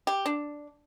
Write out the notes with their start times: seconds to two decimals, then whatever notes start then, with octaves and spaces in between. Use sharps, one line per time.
0.07 G4
0.26 D4